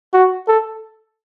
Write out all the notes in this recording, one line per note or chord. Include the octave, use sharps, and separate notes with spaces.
F#4
A4